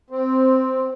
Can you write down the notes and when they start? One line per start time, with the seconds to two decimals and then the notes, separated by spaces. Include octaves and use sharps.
0.10 C4